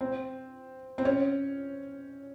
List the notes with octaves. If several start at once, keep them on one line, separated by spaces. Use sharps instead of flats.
C4
C4
C#4